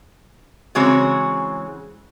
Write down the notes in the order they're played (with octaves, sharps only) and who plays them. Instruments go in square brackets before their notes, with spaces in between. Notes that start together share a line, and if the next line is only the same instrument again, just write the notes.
[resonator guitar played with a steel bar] C#3 E3 G#3 C4 F#4 C#5